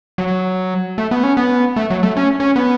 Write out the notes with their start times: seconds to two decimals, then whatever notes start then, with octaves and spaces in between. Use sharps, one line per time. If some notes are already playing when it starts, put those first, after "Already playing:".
0.18 F#3
0.98 A3
1.11 B3
1.24 C#4
1.37 B3
1.76 A3
1.90 F#3
2.03 A3
2.17 C#4
2.40 C#4
2.56 B3